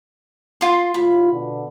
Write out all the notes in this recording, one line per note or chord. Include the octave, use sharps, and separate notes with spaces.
F4 C6
D#2 A2 F4 B5
B2 D3